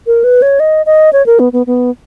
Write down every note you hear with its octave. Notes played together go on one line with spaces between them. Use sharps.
A#4
B4
C#5
D#5
D#5
C#5
A#4
B3
B3
B3